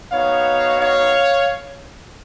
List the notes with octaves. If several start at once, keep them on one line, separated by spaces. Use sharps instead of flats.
B3 D#4 F#4 C#5 F5
C#5 F5